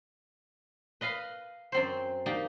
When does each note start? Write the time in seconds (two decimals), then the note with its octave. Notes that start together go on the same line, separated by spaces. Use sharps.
1.01 B4 D#5 F5 A#5 B5
1.72 F#2 C4 C5
2.26 A#3 D#4 G4 D5